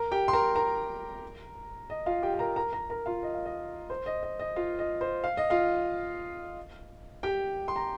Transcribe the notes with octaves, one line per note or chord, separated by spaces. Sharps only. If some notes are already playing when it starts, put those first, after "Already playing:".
Already playing: A#4 A#5
G4 G5
C6
A#4 A#5
A#4 A#5
D#5
F4 F5
G4 G5
G5
A#4 A#5
A#4 A#5
A#4 A#5
A#4 A#5
F4 F5
D#5
F5
D#5
C5
D#5
D#5
D#5
F4 F5
D#5
C5
F5
D#5
F4 F5
G4 G5
C6
A#5